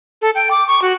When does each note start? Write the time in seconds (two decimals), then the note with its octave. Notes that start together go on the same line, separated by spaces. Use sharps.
0.22 A4
0.35 G5
0.51 D6
0.68 C#6
0.82 F#4